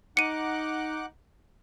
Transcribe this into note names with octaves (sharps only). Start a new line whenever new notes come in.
D#4 F#5 D6 F#6 C#7 D#7